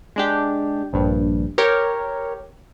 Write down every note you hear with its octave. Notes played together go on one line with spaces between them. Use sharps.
G#3 D4 G4
A#1 G2
G4 A#4 C#5